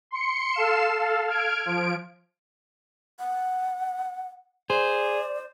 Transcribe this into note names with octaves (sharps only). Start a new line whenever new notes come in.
C6 C#7
A4 F5 C7 E7
A4 F5
F6 G#6 D7
F3 D7
F#5
G#4 C5 D5